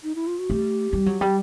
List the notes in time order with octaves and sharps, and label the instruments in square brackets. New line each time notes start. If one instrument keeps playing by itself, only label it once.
[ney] D#4
E4
F4
F#4
[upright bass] A3 [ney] G4
[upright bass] G3
F#3
G3